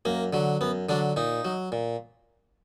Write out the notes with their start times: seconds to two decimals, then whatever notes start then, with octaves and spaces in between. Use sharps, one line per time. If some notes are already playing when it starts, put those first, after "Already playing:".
0.05 F#2 A#3
0.33 D3 F#3
0.61 F#2 B3
0.89 D3 F#3 D4
1.16 A#2 D#4
1.45 F#3
1.72 A#2